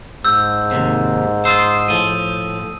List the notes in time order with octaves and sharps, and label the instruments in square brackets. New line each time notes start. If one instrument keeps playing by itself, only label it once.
[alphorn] G#2 [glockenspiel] E6 G6
[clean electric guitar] D#2 C3
[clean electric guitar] F4 C5 [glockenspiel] D#6 E6
[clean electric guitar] A2 F3 [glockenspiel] D#7